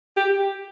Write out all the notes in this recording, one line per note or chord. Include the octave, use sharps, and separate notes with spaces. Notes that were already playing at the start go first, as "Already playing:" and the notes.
G4